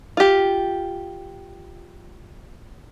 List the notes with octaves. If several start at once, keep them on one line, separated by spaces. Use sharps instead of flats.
F4 G4